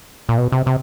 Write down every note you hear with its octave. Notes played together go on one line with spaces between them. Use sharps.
A#2
B2
C3
C3